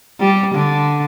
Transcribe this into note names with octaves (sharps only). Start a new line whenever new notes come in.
G3
D3